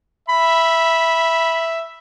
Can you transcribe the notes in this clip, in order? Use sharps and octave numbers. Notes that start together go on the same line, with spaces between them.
E5 B5